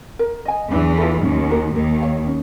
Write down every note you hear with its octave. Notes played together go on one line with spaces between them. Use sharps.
A#4
D#5 G#5
E2 E3 D4
F4 A4
D#2 D#3 C#4
F#4 A#4
D#2 D#3 A#4
C#5 F5
C#4